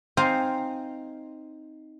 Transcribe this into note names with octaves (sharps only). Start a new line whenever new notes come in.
C4 D#4 C5 F5 G#5